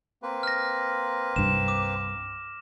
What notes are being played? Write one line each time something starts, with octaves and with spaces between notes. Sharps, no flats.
A#3 C4 B4
F6 A#6
C2 G2 E7
D6